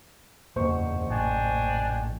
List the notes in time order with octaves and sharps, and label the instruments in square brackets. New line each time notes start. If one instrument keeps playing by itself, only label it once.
[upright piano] F#1 C5 C#6 [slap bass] E2 G2 A#2
[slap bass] A1 A#2 [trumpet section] D4 G5 G#5